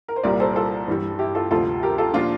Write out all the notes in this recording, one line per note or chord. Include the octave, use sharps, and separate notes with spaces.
A#4
C5
C2 A#2 G3 A#4 D5
A4 C5
F4 A4
G2 E3 G3
E4 G4
F4 A4
D2 C3 F3 F4 A4
G4 A#4
F4 A4
A#2 F3 D4 F4